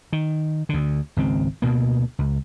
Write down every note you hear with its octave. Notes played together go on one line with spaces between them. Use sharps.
D#3
D2 D3
G#1 C#2 C4
D2 B2 A#3
C#2